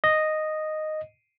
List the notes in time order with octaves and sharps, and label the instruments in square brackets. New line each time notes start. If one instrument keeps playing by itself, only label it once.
[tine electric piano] D#5